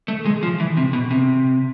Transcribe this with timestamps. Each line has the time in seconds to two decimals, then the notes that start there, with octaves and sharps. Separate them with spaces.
0.08 A3
0.25 G#3
0.43 F3
0.60 E3
0.77 C3
0.93 B2
1.11 C3